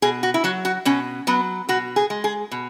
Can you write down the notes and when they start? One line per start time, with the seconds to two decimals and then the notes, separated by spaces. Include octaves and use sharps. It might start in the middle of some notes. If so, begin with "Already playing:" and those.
0.02 B2 G#4
0.23 F#4
0.34 E4
0.44 F#3 F#4
0.65 F#4
0.85 B2 C#4
1.27 F#3 B3
1.69 B2 F#4
1.96 G#4
2.10 G#3
2.24 G#4
2.51 B2